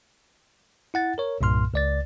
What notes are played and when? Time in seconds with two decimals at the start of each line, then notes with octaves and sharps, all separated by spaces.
0.94 E4 F#5 A6
1.18 A#4 C#5
1.41 C2 G2 A#2 C6 F6
1.74 C#2 D5 A6